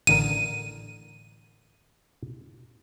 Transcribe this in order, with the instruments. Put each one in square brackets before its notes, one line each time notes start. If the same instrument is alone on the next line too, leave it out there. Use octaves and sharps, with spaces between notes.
[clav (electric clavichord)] A1 D3 A#4 [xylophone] D#7